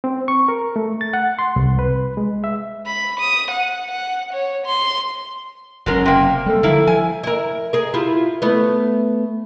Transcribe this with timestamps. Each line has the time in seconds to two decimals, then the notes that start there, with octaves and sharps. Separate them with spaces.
0.04 C4
0.28 C#6
0.48 A#4
0.76 A3
1.01 A6
1.13 F#5
1.39 C6
1.56 C2
1.79 B4
2.17 G#3
2.44 E5
2.86 B5
3.20 D#6
3.51 F#5
3.91 F#5
4.33 C#5
4.66 C6
5.86 F#1 F#3 G#3 C#4 A#4
6.06 C3 A#3 G5
6.46 G3 A#3 A4
6.63 D3 F3 A#3 E4
6.87 F3 G#5
7.23 E4 A#4
7.73 G#4 A#4
7.94 E4 F4 G4
8.42 A3 B3